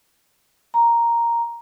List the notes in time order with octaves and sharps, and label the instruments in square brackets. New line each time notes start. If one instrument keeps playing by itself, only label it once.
[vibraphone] A#5